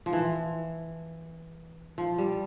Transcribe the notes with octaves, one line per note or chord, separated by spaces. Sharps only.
F3
E3
F3
G3